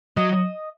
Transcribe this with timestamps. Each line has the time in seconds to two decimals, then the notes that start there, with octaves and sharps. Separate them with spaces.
0.17 F#3 D#5